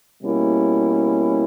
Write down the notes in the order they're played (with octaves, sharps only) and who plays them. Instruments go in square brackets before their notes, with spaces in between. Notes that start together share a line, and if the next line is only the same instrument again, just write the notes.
[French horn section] B2 G3 A#3 C#4 E4